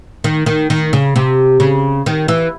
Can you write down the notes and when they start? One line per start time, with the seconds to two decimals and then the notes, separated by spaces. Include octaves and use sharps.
0.24 D#3
0.46 D#3
0.70 D#3
0.93 C#3
1.16 C3
1.60 C#3
2.06 D#3
2.28 E3